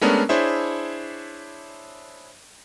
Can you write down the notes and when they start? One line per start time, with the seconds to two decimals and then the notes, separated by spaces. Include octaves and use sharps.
0.01 G#3 A3 B3 C#4 D4 A#4
0.29 D4 E4 G#4 C5 C#5 E5